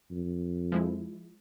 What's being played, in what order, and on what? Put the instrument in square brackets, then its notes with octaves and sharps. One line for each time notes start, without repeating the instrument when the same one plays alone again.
[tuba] F2
[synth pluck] F3 G#3 E4